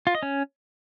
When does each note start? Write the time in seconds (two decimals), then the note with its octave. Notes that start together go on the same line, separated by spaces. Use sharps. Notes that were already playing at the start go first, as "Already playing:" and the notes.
0.07 F4
0.15 D#5
0.23 C#4